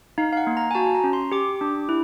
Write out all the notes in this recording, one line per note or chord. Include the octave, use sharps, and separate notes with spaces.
D#4 F5
F5
F#5
A#3
A#5
G#5
F#4 A5
A#5
C#4
C6
G4 D6
D4
E4